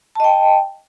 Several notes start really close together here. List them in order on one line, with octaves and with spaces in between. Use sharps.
A5 D#5 G5